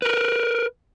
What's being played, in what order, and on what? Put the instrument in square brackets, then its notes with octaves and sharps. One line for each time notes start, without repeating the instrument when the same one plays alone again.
[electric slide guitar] A#4 B4